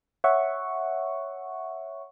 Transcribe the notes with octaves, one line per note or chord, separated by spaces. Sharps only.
C#5 E5 F#5 C#6